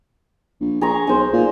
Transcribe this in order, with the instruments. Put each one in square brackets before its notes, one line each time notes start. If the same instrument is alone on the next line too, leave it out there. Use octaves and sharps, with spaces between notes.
[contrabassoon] A#1
[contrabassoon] A#1 [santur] G#4 A#5 C#6
[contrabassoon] B1 [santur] G#3 C5
[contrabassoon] A#2